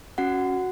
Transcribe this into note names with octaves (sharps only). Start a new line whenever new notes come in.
C#4 F#4 F#5